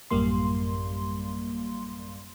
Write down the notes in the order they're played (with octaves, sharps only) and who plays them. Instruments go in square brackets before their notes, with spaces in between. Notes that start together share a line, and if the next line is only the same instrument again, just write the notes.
[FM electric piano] A1 F#2 G3 A#3 C6